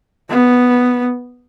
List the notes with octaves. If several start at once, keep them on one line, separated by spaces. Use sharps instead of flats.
B3